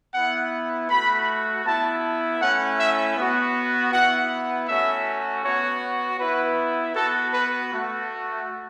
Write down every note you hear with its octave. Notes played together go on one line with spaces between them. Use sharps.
B3 E4 F#5
A3 F#4 B5
B3 E4 A5
A3 C#4 E4 F#5
E5
B3 F#4
B3 E4 F#5
A3 C#4 F#4 E5
B3 F#4 C#5
B3 E4 B4
B3 F#4 A4
B4
A3 F#4